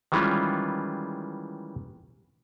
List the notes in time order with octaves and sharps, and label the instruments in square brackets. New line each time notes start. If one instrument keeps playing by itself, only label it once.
[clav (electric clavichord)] D#3 E3 G3 G#3 C#4 F4